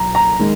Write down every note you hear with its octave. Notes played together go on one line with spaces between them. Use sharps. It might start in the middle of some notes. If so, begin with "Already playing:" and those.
Already playing: B1 A#2 F#3 A#5
A#5
D#3 G#3